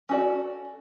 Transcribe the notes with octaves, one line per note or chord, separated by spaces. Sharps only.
C#4 F#4 A4 D5